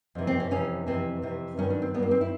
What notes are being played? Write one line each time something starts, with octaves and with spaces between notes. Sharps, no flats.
F2 C3 E3
C4
C#4
F2 C3 E3 C#4
F2 C3 E3 C4
F2 C3 E3
G2 D#3 F#3 C#4
D4
C4
G2 D#3 F#3 B3
A#3
C4
E4